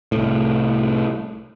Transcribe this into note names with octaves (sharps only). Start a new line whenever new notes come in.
C2 A2